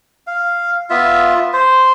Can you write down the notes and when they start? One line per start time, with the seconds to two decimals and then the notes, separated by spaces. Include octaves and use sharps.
0.27 F5
0.90 B3 F4 E5
1.53 C5